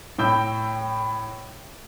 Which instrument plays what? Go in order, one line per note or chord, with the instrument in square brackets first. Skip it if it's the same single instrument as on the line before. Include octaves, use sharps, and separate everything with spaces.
[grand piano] A2 G5 E6 G6